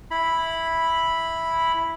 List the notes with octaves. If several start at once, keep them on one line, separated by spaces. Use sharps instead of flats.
E4 B5